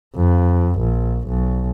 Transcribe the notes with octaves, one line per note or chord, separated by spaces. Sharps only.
F2
A#1
B1